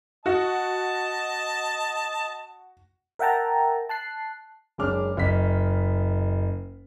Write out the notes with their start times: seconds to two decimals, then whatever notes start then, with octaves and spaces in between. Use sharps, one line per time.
0.26 F#4 D#5 A5
3.19 A#4 E5 F#5 G5 A5 A#5
3.89 A5 F#6 C7
4.78 F#1 G#3 C#4 D4 D6 F6
5.17 F#1 D#5 B6